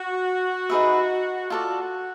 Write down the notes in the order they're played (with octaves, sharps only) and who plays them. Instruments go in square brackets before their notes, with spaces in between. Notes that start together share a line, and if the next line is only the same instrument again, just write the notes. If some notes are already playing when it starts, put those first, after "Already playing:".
Already playing: [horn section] F#4
[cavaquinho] D#4 G#4 B4 E5
[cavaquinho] F4 A4 D5 [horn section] F#4